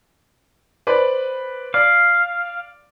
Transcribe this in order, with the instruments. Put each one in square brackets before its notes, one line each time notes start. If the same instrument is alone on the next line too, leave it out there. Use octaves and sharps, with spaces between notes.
[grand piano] B4 C5 D5
[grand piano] D5 [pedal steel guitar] F5